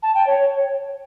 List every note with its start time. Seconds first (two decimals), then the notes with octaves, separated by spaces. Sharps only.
0.03 A5
0.15 G5
0.27 C#5